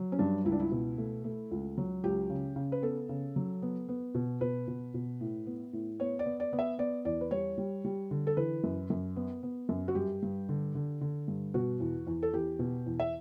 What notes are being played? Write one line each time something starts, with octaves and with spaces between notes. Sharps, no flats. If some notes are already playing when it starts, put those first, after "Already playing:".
Already playing: F#3
C#4
G2 D4
C#2 E4
D4
E4
B2
A3
A3
C#2
F#3
C#2 G4
C#3
C#3
B4
B3 A4
C#3
F#3
B3
B3
B2
B2 B4
B2
B2
A2
B3
A2
B3 C#5
D5
B3
D5
B3
E5
B3 D5
E2 D5
B4
G3 C#5
G3
G3
D3
A4
E3 B4
F#2
F#2
B3
B3
F#2
F#4
G2 G4
G2
D3
D3
D3
G2
B2 F#4
E2
E2
A4
E2 G4
B2
E2
E5